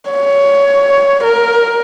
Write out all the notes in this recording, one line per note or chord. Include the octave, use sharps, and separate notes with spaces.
C#5
A#4